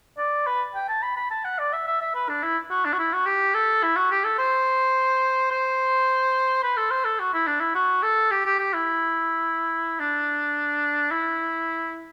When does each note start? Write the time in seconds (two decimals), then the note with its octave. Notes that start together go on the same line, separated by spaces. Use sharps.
0.18 D5
0.47 B4
0.75 G5
0.89 A5
1.03 B5
1.17 B5
1.31 A5
1.45 F#5
1.59 D5
1.73 E5
1.87 E5
2.01 E5
2.15 B4
2.29 D4
2.43 E4
2.70 F#4
2.85 D4
2.93 F#4
2.99 E4
3.13 F#4
3.26 G4
3.54 A4
3.83 E4
3.96 F#4
4.11 G4
4.24 A4
4.39 C5
5.51 C5
6.63 B4
6.77 A4
6.91 C5
7.05 A4
7.20 F#4
7.34 E4
7.47 D4
7.61 E4
7.75 F#4
8.03 A4
8.31 G4
8.46 G4
8.59 G4
8.74 E4
10.00 D4
11.11 E4